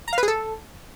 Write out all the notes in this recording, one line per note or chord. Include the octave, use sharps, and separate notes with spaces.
A#5
F5
B4
G#4
A4